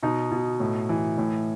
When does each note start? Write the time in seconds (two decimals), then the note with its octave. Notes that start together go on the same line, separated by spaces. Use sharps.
0.02 B2 D#4
0.31 B2
0.60 A2
0.89 E3
1.18 A2